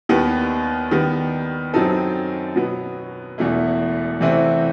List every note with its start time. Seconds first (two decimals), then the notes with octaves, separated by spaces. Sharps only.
0.09 D#2 D#3 G3 B3
0.91 D#3 G3 B3
1.74 F#2 F#3 C4 D#4 A4
2.56 B2 F#3 B3
3.38 E1 E2 B2 A3 E4
4.20 E2 C3 E3 A3 C4